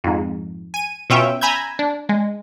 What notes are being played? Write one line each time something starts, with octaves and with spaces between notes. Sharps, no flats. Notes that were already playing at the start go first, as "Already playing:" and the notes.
F2 G#2
G#5 D#7
B2 C#4 F4 E5 G5
G#5 A#5 B5 E6 G6 G#6
D4
G#3